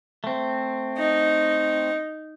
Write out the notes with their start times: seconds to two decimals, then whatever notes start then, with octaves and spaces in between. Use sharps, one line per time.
0.24 A3 C4
0.98 D#4